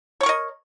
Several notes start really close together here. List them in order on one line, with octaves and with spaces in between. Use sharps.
C#5 C#6 A#4 D#5